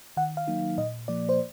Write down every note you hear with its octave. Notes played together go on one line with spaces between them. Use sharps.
D#3 F#5
F5
F#3 A#3 D#4
A#2 D#5
F3 A#3 D5
C5